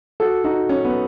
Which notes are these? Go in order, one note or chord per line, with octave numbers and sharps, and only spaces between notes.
F#4 A4
D#4 F#4
C#4
B3